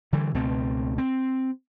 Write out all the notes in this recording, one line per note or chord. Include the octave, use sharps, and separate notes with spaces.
D3 E3 G3
C#2 B2 A3 C4
C4